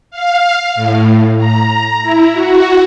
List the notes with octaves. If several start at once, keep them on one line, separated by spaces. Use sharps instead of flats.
F5
A2
A#5
E4
F#4